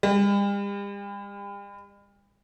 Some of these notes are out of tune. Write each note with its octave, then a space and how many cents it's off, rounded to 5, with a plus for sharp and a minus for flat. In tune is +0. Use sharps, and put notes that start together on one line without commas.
G3 +45